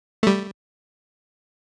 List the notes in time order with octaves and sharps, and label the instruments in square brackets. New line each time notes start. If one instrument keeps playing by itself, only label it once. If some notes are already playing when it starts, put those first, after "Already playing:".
[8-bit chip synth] G3 A3